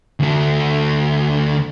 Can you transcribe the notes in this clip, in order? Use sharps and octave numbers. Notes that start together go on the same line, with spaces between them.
D2 A3